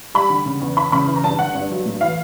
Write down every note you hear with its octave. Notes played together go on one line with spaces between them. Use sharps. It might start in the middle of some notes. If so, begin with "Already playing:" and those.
G3 B5
D3
C#3
E2
E3 B5
C#3 B5
E3
A#5
G2 A5
D3 F#5
G2
F#3
A2
E3 F5